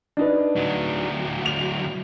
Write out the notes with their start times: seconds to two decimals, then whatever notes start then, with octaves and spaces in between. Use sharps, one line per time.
0.17 D4 D#4 B4
0.56 D2 F#3
1.46 F7